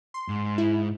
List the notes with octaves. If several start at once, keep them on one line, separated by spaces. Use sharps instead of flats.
C6
G#2
E4